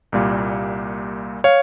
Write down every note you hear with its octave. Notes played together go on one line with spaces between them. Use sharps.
C2 A#2 G3 A#3
C#5 F5